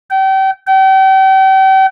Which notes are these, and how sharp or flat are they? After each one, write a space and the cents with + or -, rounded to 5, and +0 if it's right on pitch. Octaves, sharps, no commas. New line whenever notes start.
G5 -35
G5 -40